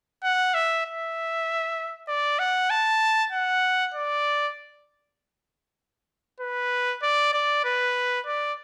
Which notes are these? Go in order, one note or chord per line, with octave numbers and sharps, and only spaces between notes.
F#5
E5
E5
D5
F#5
A5
F#5
D5
B4
D5
D5
B4
D5